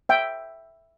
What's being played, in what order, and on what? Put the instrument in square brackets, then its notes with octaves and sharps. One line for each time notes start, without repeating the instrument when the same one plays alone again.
[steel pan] E5 G5